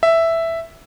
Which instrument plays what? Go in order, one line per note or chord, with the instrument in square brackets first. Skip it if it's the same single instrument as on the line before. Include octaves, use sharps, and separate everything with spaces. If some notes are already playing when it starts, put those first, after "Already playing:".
[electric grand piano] E5